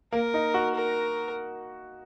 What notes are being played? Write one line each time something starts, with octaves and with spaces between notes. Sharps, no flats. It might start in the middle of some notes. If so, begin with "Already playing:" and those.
A#3 A#4
D#4
F#4
A#4